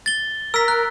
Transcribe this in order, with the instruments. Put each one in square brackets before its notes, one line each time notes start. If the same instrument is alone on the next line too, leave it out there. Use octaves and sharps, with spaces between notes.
[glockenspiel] A6 G7
[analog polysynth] A#4 [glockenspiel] E6 B6
[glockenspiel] F#6